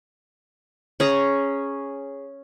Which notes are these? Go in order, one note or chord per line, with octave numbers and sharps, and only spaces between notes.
C#4 G#4 A#5